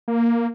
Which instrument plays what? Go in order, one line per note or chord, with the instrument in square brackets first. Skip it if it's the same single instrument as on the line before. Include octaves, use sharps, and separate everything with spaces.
[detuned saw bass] A#3